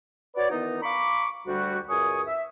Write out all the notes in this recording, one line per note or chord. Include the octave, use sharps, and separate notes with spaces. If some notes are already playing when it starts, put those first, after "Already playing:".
F#4 B4 C#5 D5
D#3 E3 B3 D#4
F5 A#5 B5 C#6 D6
D2 G3 F#4
C#2 F#2 G#5 C#6 D#6
E5